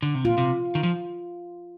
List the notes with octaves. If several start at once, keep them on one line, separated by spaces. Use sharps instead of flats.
D3
C3
A#2 F4
C3
D#3
F3